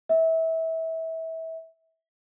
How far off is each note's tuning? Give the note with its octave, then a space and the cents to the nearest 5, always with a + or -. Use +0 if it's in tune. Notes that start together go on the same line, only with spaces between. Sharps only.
E5 -25